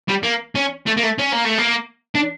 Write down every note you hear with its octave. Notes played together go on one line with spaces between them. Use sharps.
G3
A#3
C#4
A3
A#3
A3
C#4
A#3
A3
A#3
D4